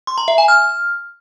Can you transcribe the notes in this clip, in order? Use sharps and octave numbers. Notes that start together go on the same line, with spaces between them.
C6
A#5
E5
G#5
F6